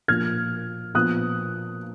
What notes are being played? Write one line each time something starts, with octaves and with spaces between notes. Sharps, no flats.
A#2 F3 A#3 F6 G#6
A#2 F3 B3 D#6 F#6